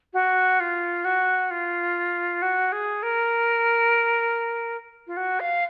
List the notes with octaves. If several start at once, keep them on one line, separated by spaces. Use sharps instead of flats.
F#4
F4
F#4
F4
F#4
G#4
A#4
F4
F#4
F5